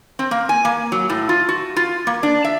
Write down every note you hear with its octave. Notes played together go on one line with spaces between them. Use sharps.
C4
A#3
G#5
A#3
F#3
A2
F4
F#4
F4
A#3
D4
E5